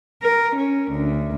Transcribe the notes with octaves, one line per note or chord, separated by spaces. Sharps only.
A#4
C#4
D2